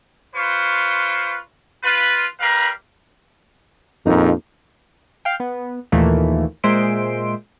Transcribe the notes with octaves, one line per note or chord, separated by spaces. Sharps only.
F4 B4 C5 C#6
F4 B4
G3 A#4 B4 F5
A#1 F2 A#3 D#4
F5 G5
B3
D#2 A#2 D#3 E3 A3 A#3
A#2 G#3 C5 E5 C6 D7